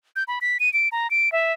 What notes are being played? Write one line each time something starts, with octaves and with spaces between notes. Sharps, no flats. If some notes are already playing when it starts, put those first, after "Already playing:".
G6
B5
B6
D#7
D7
A#5
D7
E5